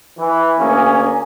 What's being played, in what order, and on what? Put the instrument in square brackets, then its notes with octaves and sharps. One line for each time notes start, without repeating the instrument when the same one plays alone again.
[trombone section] E3
D2 A#3 C#4 G#4